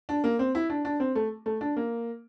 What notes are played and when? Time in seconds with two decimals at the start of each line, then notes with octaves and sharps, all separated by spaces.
0.09 D4
0.24 A#3
0.39 C4
0.55 E4
0.70 D4
0.85 D4
1.00 C4
1.15 A3
1.46 A3
1.61 D4
1.77 A#3